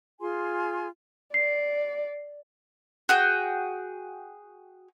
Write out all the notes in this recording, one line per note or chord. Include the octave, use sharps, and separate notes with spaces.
F4 G#4 G#5 C6
D5 C7
F#4 G#4 G5